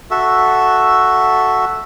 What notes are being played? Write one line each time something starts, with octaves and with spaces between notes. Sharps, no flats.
F#4 A4 E5